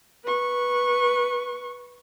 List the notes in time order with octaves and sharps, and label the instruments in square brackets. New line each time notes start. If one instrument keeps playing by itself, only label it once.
[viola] B4 C#6